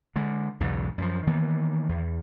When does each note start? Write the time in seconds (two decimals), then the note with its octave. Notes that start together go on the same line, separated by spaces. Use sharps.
0.16 D3 G#3
0.60 B1 E2 G#2 C#3
0.98 F#2 F3
1.27 D#3 E3 A#3 B3
1.89 E2